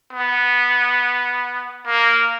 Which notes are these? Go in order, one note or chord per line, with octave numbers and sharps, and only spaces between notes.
B3
A#3